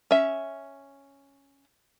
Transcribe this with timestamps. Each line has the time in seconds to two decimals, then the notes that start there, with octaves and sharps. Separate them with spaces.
0.11 C#4 E5